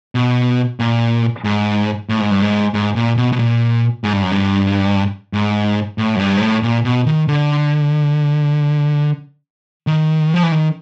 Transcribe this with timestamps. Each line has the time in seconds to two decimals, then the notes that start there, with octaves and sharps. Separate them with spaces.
0.15 B2
0.80 A#2
1.44 G#2
2.09 A2
2.20 G#2
2.31 G2
2.42 G#2
2.74 G#2
2.96 A#2
3.17 B2
3.32 B2
3.39 A#2
4.04 G#2
4.13 G2
4.23 F#2
4.32 G2
5.33 G#2
5.98 A2
6.16 F#2
6.19 G2
6.37 G#2
6.42 A2
6.63 A#2
6.85 B2
7.06 D#3
7.28 D3
9.87 D#3
10.34 F3
10.43 E3
10.52 D#3